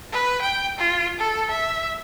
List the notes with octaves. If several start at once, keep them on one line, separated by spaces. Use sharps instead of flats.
B4
G5
F4
A4
E5